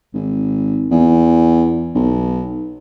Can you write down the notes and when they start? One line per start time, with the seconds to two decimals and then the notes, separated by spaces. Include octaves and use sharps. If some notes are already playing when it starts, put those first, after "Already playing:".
0.14 G#1
0.91 E2
1.95 B1